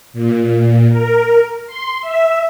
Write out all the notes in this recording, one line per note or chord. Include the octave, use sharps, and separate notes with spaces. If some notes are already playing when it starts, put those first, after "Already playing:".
A#2
A#4
C6
E5